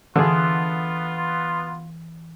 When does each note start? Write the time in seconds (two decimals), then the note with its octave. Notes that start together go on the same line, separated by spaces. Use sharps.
0.16 D3 E3 B3 F4 G#4